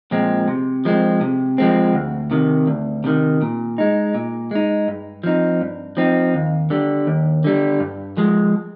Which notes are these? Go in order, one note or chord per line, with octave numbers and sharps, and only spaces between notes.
A#2 F3 G#3 C4
C3
F3 G#3 C4
C3
F3 G#3 C4
D2
C3 D#3
D2
C3 D#3
A#2
G#3 D#4
A#2
G#3 D#4
G2
F3 C4 D#4
G2
F3 C4 D#4
D#2
D3 G3
D#2
D3 G3
G2
F3 G#3